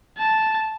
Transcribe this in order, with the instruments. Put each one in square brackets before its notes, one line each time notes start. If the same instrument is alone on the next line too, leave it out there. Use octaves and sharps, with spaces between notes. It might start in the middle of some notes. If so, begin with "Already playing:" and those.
[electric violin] A5